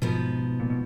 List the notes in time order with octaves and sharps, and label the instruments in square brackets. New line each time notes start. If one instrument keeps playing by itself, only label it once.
[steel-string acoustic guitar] G#2 F3 B3 [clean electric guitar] B2
[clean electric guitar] A#2
B2